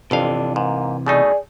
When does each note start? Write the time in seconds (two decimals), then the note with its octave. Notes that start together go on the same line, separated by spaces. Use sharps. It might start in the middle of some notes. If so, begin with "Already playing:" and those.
0.11 G1 F2 C3 E3 D4 F5
0.56 G#2 A#3
1.06 B2 A3 D#4 G#4 D5